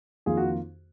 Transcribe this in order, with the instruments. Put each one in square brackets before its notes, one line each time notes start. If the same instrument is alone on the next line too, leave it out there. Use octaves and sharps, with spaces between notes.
[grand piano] F2 D#3 A#3 F4 [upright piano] G#4
[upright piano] F#4